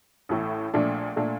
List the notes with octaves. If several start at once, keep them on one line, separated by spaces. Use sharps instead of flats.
A1 A2 A3
A#1 A#2 A3 D4
A#2 A3 D4